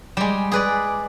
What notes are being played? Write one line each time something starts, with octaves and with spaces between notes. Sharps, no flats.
G3 G#3
G#4 B4 D5